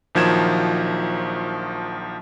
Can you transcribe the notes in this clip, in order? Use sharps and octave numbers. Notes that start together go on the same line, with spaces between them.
A#1 D#3 F3 F#3 G#6 E7